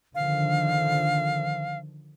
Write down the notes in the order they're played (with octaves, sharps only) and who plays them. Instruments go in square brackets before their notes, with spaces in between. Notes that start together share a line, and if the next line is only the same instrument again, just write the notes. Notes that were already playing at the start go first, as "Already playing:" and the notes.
[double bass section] D3 D#3 F3 [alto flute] F5